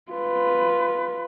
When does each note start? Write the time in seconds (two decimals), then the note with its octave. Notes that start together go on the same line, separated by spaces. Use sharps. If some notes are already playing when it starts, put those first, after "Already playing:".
0.11 F4 B4